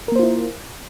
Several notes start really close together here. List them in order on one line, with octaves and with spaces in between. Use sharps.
A#4 A#3 C5 F4 E4